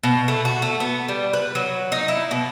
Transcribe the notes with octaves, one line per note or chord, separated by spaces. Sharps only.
B2
A3
F#4
A3
B3
G3
B4
F#3
D#4
E4
B2